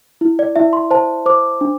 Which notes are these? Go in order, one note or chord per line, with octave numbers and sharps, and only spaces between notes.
E4
D5
E4 E5
C6
C5 A5
C5 D6
D4